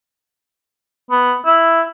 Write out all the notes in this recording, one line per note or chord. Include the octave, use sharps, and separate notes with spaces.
B3
E4